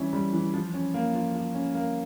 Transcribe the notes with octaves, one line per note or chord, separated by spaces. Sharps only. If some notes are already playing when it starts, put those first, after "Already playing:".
Already playing: E3 G3 C#4 E4
G3
E3
F3
C#4
A#3
F3
F3
C#4
A#3